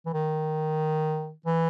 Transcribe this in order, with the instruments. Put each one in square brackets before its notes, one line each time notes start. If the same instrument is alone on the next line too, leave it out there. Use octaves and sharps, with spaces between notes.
[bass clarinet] E3
D#3
E3